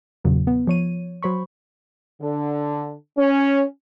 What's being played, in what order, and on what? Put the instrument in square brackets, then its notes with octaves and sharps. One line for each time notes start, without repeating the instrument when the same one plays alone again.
[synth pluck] E2 A#2 C#3 F#3
B3
F3 C#5 D#7
F#3 C5 B5 C#6
[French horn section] D3
C#4